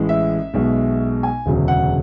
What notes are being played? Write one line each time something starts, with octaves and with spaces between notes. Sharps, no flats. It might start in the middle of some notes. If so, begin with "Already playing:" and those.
Already playing: A1 A2 G#3
E5
B1 B2 G#3
G#5
E1 D2 C#3 F#3
F#5